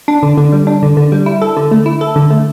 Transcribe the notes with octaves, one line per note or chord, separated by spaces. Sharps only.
D4
D3
D3
G3
D4
D3
D3
G3
E4
A4
D3
A3
E4
A4
D3
A3